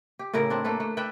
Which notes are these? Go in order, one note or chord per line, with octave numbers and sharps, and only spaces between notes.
G4
A2 C#3 E4 A#4
C4 D4
A3 A#3 A4 B4
A3
B4 D5 E5 G5